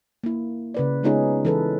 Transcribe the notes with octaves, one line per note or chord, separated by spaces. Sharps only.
A#3 E4
C#3 B4 D5
G#3 B3 C#4 D#4 F4 G#4
E3 A4 B4